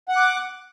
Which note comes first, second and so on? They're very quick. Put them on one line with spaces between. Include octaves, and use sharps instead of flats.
F#5 F#6 D6